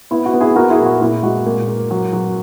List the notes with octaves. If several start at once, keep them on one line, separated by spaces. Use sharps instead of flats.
B3 E4
F#4
B3
E4 G#4
A#3 F#4 A#4
E4 G#4
A#2
F#4
A#2 E4
G#3 F#4
A#2
A#3
F#3
F#3